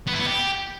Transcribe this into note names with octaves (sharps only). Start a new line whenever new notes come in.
B3
E4
B3
G4